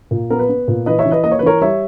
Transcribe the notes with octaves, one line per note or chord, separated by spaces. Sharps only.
A#2
B3 A#4
B4
B3
A#2
E3 B4 D#5
C#5 E5
E3
B4 D#5
A#3 D#5
C#5
B4
E3 A#4 C#5
G3 C#5 E5